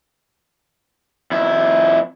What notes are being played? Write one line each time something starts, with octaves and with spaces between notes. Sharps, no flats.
F2 E4